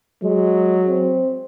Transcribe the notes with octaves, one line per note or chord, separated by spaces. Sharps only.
F#3 G#3
C4